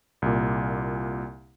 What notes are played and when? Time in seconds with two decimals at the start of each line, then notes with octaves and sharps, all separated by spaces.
0.22 C2 A#2